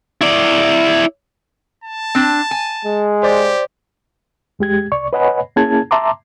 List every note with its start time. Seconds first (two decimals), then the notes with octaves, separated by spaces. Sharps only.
0.21 E4 D5
1.84 A5
2.15 C4 D4
2.51 G#5
2.85 G#3
3.23 G4 C5 D5
4.59 E2 G#3 G4 G#6
4.92 C2 D5 C#6
5.13 B4 C#5 D#5 F#5 G#5 B5
5.56 A#3 C#4 E4 G#4 A5 G#6
5.91 E5 A5 A#5 C6 D6